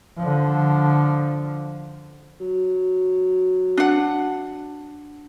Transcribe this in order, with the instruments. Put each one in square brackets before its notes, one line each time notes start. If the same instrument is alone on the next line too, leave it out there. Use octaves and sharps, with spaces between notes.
[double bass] D3 F3
[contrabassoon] F#3
[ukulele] D4 F#5